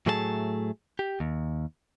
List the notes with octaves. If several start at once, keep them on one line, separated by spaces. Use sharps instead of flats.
A2 F#3 A3 G#4 B4 A5
G4
D#2